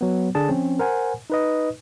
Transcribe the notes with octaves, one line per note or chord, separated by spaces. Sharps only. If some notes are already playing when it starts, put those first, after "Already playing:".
F#3 B3
D3 D4 G#4 A5
F3 C4 C#4
A#4 C5 F#5 G#5
D#4 B4 D#5